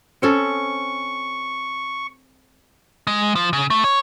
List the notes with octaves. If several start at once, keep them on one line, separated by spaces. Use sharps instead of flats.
C4 C#4 A4 C#6
G#3
F3
C#3
A3
C#5